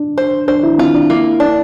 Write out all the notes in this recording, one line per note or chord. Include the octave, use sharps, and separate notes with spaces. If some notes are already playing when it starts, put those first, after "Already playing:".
Already playing: D4
C5
D4 C5
E4
C4 F4
D4
A#3 E4
D4